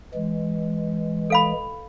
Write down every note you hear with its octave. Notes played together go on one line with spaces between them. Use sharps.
E3 G#3
A4 F5 B5